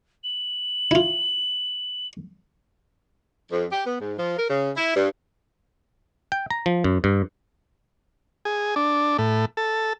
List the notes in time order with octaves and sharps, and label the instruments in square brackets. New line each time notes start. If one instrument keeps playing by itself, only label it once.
[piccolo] F#7
[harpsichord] E4 F4
[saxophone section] F2
G4
B3
G#2
F3
A#4
C#3
E4
G2
[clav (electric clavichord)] G5
A#5
F3
F#2
G2
[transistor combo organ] G#4
D4
A2
A4